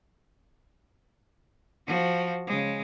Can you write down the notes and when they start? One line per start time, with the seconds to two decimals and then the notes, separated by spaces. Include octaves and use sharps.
1.87 F3 F#4
2.47 C#3 G#3